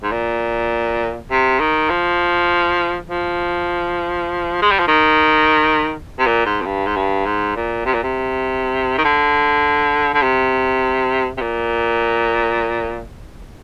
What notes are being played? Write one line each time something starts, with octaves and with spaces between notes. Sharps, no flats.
G#2
A#2
C3
D#3
F3
F3
G#3
G3
F3
D#3
C3
A#2
G#2
F2
G2
G#2
G2
G#2
A#2
C3
A#2
C3
D#3
D3
D3
C3
C3
A#2